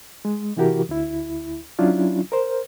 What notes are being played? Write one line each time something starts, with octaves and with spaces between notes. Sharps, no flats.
G#3
C3 E3 E4 F#4 G4 A#4
D2 E4
F#3 C#4 D4 E4 F4
A#4 C5